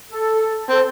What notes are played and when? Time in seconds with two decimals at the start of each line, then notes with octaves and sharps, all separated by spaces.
0.09 A4
0.70 C4 A4